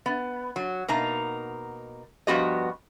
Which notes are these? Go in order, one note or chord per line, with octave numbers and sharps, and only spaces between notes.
B3
F#3
B2 A#3 D#4 A#5
G2 F3 B3 F#4 G4 D#5